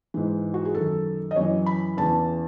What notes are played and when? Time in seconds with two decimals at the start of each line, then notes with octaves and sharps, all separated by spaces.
0.14 G#2 E3
0.54 F#4
0.65 G#4
0.74 F#2 D#3 A4
1.31 D#5
1.36 F#2 E3 C#5
1.66 B5
1.97 E2 C#3 E3 A5